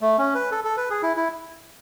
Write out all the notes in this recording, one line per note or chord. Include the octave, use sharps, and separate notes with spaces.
A3
C#4
B4
A4
A4
B4
G#4
E4
E4